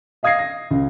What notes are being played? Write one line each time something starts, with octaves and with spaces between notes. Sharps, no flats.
D#5 F5 D#6 G#6 A#6 C7
A#6
C#2